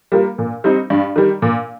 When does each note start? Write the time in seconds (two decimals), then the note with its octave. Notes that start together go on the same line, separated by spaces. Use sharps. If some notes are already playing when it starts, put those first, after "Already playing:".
0.12 G3 A#3 F4 A#4
0.38 A#2
0.64 G3 C4 D#4
0.90 G2
1.16 D#3 G3
1.42 A#2